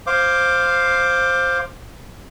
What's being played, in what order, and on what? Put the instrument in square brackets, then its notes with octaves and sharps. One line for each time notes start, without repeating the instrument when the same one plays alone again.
[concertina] C5 F5 D6